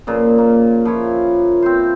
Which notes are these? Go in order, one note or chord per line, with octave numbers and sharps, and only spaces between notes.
A#2 C#3 F3
A#3
F3 E4 C#5
C4 C5